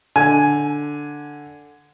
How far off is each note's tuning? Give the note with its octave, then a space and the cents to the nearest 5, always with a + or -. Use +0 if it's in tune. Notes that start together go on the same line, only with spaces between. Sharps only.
D3 +0 G#5 +5